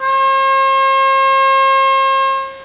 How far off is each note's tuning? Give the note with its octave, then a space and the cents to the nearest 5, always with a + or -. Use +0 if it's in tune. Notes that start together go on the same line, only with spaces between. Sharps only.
C5 +45